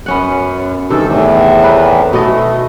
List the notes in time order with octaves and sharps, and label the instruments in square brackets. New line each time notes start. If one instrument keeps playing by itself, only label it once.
[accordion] F#2 [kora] B3 C#4 F#5
[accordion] G2 E3 A4 [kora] C3 D#3
[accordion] E2 A2 E3
[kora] C4 A#4 B4
[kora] B2 A4 D#5 [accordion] A3